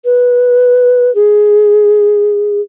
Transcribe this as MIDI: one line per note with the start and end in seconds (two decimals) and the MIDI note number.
0.04 1.13 71
1.15 2.60 68